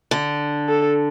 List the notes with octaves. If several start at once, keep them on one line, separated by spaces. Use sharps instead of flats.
D3
A4